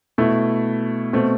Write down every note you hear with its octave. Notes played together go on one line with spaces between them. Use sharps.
B2 A3 E4
B2 A3 C4